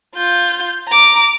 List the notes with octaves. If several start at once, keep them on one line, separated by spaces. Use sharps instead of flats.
F4 G6
A#5 D6